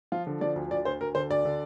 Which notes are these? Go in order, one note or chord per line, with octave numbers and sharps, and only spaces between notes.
F3 F4
D3
F3 D5
D2
D2 D5
D2 C5
D2 A#4
D3 C5
D2 D5
D3